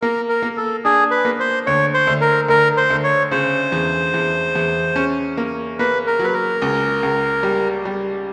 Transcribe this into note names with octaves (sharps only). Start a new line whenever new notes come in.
A#3 A#4
A#4
A#3
A4
D4 G#4
B4
A#3
C5
D2 C#5
C5
D2
A#4
D2 A#4
C5
D2
C#5
C#3 C5
E2
E2
E2
C#4
A#3
A#3 B4
A#4
F#3 B4
A#4
C#2
C#2
G3
G3